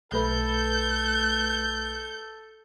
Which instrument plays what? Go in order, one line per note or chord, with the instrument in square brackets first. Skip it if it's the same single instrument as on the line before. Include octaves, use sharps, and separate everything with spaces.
[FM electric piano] B1 A3 B4 [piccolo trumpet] A4 [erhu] G6